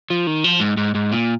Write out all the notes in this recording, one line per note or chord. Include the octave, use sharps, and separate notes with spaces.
F3
D#3
F3
G#2
G#2
G#2
A#2